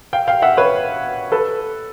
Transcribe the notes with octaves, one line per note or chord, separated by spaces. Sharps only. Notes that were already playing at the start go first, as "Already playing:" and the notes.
F5 G5
F5 G5
E5 F#5
B4 C#5
A4 B4